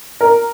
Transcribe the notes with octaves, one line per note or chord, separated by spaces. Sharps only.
A#4